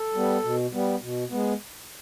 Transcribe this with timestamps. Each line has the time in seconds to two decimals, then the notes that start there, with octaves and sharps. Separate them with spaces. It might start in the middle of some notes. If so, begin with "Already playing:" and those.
Already playing: A4
0.14 G3 B3
0.44 B2
0.73 G3 B3
1.01 B2
1.30 G#3 B3